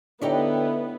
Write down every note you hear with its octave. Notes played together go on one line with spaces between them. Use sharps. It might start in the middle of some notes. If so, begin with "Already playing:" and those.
D3 B3 D#4 E4 G4 C#5